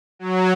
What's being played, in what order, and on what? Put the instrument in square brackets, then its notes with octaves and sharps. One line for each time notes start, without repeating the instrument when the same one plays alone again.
[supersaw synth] F#3